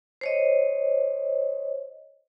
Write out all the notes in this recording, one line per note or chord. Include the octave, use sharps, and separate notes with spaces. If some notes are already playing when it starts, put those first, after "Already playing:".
C5 C#5 D#5